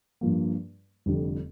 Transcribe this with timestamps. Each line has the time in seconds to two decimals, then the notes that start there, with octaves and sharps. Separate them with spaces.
0.21 G2 F3 A#3
1.06 F1 F2 D3 G3